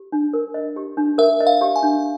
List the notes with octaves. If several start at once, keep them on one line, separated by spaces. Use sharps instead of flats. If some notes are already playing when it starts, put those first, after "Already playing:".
Already playing: G4
D4
A#4
D#5
G4
D4
A#4 E5
D#5
F5
G4
G#5
D4